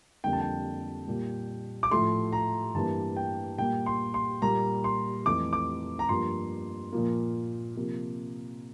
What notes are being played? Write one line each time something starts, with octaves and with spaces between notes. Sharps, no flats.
F2 D3 G3 A#3 G5
A5
G5
A#2 G3 A#3
D6
A2 F3 A3 C6
A#5
G2 E3 G3 A#3 A5
G5
A#2 G3 A#3 G5
C6
C6
A#2 G3 A#3 A#5
C6
F2 E3 A3 D6
D6
A#5
G2 F3 A#3 C6
A#2 F3 A#3
C3 F3 A#3